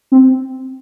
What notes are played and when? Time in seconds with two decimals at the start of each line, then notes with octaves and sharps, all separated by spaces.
0.12 C4